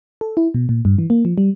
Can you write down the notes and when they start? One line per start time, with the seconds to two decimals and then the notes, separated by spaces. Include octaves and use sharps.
0.21 A4
0.37 E4
0.54 B2
0.69 A#2
0.85 G2
0.98 E3
1.10 A#3
1.25 F3
1.38 G3